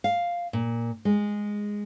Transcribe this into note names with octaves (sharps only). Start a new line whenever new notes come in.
F5
A#2
G#3